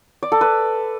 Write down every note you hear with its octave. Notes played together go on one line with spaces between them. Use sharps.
D5
A4
B4